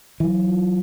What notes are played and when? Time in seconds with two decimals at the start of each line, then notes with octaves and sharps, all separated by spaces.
0.20 E3 F#3
0.47 F4